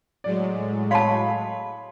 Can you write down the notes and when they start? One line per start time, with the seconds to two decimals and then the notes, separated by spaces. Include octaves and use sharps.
0.24 A2 F#3 G#3 D5
0.91 C#5 F5 A5 B5 C6